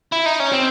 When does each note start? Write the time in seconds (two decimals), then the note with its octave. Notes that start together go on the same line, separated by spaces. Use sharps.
0.12 E4
0.26 D#4
0.40 C#4
0.52 C4